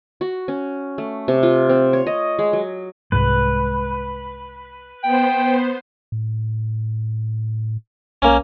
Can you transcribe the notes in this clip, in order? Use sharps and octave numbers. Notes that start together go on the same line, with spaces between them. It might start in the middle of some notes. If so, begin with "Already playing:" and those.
F#4
C#4
A3
C3
F4
C4
C#5
D#5
G#3
F#3
C2 G#2 G#3 B4
B3 C5 G5
A2
B1 A#3 C#4